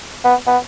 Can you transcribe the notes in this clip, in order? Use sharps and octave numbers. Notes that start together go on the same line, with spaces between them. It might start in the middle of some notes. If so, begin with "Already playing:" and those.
B3
B3